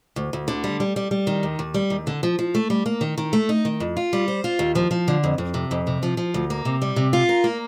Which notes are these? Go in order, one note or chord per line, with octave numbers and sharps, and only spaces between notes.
D2
D2
D3
G3
G3
G3
G3
D#3
D#2
D#2
G3
D#2
D3
F3
F3
A3
G3
A#3
D#3
D#3
A3
D#4
D#3
F2
F4
G3
C5
F4
D#2
F3
F3
D3
F2
F2
C3
F2
C3
F3
F3
D2
A#3
C3
G3
C3
F4
A#4
A#3